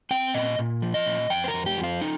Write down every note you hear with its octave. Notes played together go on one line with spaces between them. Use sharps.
C4 G5
A#2 D#5
A#2
F3
D#5
A#2
F2 G5
C5
A#4
F2
G4
F3
F4
D#4